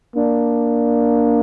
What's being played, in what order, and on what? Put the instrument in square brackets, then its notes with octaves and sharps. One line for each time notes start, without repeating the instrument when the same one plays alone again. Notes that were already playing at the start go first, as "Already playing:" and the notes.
[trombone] A#3 [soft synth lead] D4